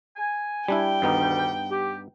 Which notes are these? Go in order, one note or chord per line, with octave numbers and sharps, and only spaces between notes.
G#5
G3 D4 E4 G5
D2 G2 D#3 G3 B3 D#4
G4